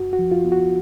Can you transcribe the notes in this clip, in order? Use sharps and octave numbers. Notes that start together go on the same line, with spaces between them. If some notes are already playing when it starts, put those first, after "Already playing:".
Already playing: F#2 F#4
F#4
F3
F4
B3
F#4